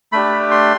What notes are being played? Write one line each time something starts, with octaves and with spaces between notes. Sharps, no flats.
A3 D4 G4 B5
C6